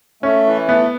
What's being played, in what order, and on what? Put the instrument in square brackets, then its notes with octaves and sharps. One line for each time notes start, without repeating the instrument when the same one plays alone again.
[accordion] A3 [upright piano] C#4
[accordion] E3
[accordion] A3 [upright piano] B3